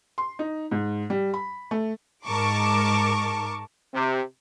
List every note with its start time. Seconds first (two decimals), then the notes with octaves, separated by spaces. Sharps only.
0.18 C6
0.39 D#4
0.71 G#2
1.10 G3
1.34 B5
1.71 A3
2.26 G#2 A#4 A5 C#6 D6
3.94 C3